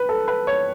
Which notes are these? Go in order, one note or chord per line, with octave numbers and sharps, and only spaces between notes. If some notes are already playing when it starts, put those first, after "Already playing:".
Already playing: B4
A4
B4
C#5